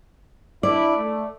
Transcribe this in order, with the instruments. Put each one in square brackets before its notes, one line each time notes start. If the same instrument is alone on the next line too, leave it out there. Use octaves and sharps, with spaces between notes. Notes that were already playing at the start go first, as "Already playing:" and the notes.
[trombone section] D4 E4 [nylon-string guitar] D5
[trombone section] A3